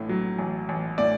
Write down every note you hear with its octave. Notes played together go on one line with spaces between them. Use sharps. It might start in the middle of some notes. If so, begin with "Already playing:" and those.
Already playing: A1 A2
F#3
A1
A1
A2 D5